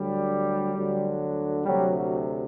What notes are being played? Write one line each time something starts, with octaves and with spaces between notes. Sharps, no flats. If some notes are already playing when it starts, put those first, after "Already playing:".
Already playing: D2 D3 F#3 G3
D2 D3 F#3
D2 C3 F#3 G3
F#3